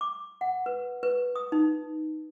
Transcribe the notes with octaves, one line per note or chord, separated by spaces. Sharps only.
D6
F#5
B4
B4
D#6
D#4